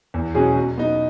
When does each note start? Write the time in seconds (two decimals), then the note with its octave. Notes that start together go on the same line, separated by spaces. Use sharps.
0.14 E2
0.34 B2 F#3 C#4 G#4
0.56 F#3
0.77 B3 D#4